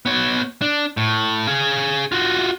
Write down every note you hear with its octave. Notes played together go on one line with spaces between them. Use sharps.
B3 C#5
D4
A2
G#4 F5
F4 F#4